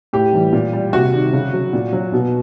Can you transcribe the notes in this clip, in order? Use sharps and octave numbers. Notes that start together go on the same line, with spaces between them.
A2 G4
E3 G3
A#2
G3
C3 F#4
D#3 G3
C#3
F#3
A#2
F#3
B2